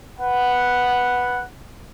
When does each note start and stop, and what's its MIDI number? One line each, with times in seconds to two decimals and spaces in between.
0.20 1.44 71
0.20 1.44 78